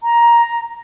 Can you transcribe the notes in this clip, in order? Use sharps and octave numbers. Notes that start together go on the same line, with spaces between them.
A#5